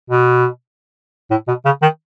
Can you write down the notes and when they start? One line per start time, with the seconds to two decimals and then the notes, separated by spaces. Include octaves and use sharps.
0.10 B2
1.31 A2
1.48 B2
1.65 C#3
1.82 D#3